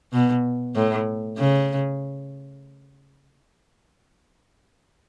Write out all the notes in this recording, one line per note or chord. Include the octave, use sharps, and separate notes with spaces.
B2
A2
C#3